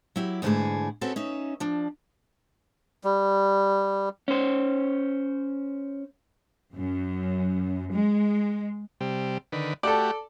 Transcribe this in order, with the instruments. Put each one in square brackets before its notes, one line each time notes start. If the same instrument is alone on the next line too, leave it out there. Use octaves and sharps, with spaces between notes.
[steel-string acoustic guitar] F#3 E4 G4
E2 G#2 D3 A3 E4 G#4
C4 C#4 F#4 G#4 A4 B4
C#4 D#4 E5
F3 D4
[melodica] G3
[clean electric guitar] C#4 C5
[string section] F#2
G#3
[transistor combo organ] C3 G3
D3 D#3 B4
[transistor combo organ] A3 F#4 G4 [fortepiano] A4 D5